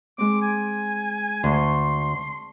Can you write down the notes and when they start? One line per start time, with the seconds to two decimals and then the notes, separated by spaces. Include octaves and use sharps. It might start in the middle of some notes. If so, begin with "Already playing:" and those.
0.18 G#3 C4 D6
0.42 G#5
1.44 D2 A5 C6 C#6 G6